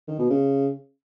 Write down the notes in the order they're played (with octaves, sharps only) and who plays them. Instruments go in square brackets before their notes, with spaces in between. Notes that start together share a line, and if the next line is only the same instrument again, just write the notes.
[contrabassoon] D#3
B2
C#3